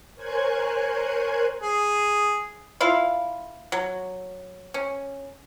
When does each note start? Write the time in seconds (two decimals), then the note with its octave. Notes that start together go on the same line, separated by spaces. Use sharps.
0.15 A#4 C5 C#5 G#5 F#6 G#6
1.62 G#4
2.81 E4 F4 F5
3.72 F#3
4.74 C#4